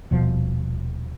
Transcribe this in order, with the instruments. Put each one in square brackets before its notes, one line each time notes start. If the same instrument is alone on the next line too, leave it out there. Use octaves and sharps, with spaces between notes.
[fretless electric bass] D#1 B2 F3